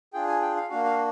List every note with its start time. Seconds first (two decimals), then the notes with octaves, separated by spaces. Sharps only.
0.13 D4 F4 G#4 G5
0.27 G#5
0.42 G5
0.56 F5
0.70 A#3 D4 F#4 F5
0.85 F5